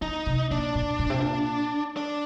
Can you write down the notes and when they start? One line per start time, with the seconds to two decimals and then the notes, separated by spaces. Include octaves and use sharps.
0.02 D3 D#4
0.27 C3
0.51 A#2 D4
0.75 A#2
0.99 A#2
1.10 C3
1.19 A#2
1.97 D4